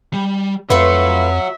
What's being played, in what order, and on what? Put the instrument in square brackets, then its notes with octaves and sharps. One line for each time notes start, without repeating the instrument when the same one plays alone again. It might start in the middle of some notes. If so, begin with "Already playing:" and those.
[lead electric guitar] G3
[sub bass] F2 [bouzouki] A3 F4 B4 [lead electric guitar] F#4 C#5 [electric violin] E5